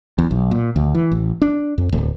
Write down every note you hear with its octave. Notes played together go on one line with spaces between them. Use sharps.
E2
B1
A#2
D2
E3
A1
D4
F2
D1